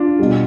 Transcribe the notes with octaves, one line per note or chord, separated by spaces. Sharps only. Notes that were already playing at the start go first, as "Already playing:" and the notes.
Already playing: D4 F4
B2 G3